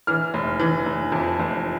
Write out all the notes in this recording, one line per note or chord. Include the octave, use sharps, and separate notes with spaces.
E3 F6
F1
E3
F1
F2
F1